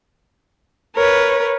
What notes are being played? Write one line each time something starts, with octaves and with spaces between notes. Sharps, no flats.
A#4 B4 C#5